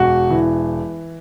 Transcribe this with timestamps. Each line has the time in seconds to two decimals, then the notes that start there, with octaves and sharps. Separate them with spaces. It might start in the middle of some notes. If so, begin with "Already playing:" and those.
Already playing: E1 F#4
0.31 E3